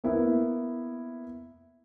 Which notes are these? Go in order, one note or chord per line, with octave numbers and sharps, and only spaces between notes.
A#3 B3 E4